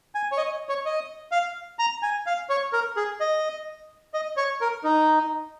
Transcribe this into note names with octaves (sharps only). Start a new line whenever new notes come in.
G#5
C#5
D#5
C#5
D#5
F5
A#5
G#5
F5
C#5
A#4
G#4
D#5
D#5
C#5
A#4
D#4